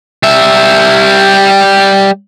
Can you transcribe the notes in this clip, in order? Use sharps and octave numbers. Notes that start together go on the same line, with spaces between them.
G3 E5